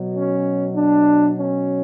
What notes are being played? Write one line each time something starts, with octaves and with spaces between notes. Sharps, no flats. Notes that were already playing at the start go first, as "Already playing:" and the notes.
Already playing: B2 F#3
C#4
D4
C#4